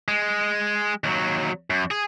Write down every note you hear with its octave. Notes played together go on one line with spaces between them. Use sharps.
G#3
D#2 F#3
F#2
G#4